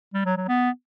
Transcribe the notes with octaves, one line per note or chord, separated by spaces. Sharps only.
G3
F#3
F#3
B3